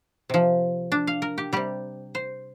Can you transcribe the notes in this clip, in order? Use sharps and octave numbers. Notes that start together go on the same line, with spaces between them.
C3 F3
D4
F5
A#4
G4
C3 G3 G4
C5